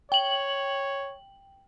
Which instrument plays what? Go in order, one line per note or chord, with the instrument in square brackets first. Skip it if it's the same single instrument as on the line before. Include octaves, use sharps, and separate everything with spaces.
[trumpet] C#5 [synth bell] G5 F#7